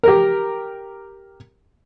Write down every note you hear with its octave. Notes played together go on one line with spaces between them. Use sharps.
G4 A#4